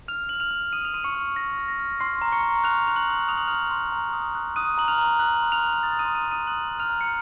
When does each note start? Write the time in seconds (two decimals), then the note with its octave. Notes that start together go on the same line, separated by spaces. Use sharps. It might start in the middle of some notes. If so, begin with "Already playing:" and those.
0.08 F6 F7
0.29 F6 F#7
0.40 F6 F7
0.51 F6
0.72 D#6 F6 D#7
0.85 F7
0.94 C6 D#7
1.04 C#6 C#7
1.15 F6
1.36 F6 A#6
1.58 F6
1.68 A#6
1.80 F6
2.00 C6 F6 C7
2.22 A#5
2.32 C#6 C#7
2.43 A#5
2.64 F6 F#6 F7
2.85 C6 F7
2.96 F#6 F#7
3.07 D#6
3.28 D#6 F7
3.38 F#7
3.48 F6 F#6 F7
3.71 C6
3.92 A#5
4.13 D#6
4.35 F#6
4.56 D#6 F#6 D#7
4.78 A#5 F#7
4.88 F6 F7
4.98 A#5
5.19 F#6 F#7
5.42 C6
5.52 F6 F7
5.62 C6
5.83 D#6 A6
5.99 D#6 D#7
6.05 C6
6.15 D#6 D#7
6.27 C6 D#6 D#7
6.47 F#6 F#7
6.68 D#6
6.79 F6 F7
6.90 A#5
7.01 C#7